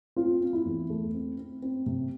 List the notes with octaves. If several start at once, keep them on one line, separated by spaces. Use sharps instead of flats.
C4 F4
C4
E4
E2
A3
C4
C4
C4
C3